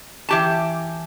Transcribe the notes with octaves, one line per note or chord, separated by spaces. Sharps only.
E3 G4 A5